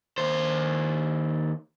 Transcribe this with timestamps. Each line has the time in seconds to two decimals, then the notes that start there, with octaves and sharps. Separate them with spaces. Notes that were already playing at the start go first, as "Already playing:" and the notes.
0.18 D#2 C5